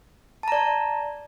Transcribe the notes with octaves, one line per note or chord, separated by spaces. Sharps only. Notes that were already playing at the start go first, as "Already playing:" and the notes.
D5 A5 A#5